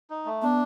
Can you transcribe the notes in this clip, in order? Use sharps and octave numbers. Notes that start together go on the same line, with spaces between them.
D#4
A3
B3 D4